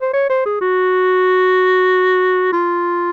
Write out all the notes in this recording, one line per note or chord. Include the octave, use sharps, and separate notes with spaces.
C5
C#5
C5
G#4
F#4
F4